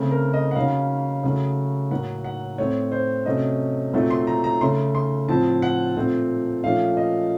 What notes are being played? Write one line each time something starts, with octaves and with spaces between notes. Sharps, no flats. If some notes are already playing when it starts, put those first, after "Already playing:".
Already playing: C#3 A3 C4
A#4
D#5
F#5
C#3 F#3 A#3 C#4 F5
C#3 F#3 A3
A2 F#3 A#3 F#5
F#5
A2 A3 C4 C#5
C5
C3 F#3 A3 C#4 D#5
A#2 F#3 A3 C4
C6
A#5
A#5
C#3 A3 C#4 C6
C6
A2 F3 C4 A5
F#5
A#2 A3 C4
A#2 F3 A3 C#4 F5
D#5